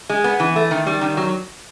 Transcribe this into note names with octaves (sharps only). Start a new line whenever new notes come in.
G#3
B3
E3
A3
D#3
G3
D#3
F#3